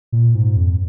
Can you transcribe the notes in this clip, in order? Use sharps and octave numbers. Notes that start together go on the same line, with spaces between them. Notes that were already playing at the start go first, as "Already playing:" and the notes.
A#2
G#2
F2